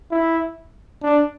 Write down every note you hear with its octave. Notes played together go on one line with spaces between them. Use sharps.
E4
D4